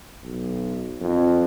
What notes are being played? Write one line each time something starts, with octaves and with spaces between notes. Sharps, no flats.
B1
F2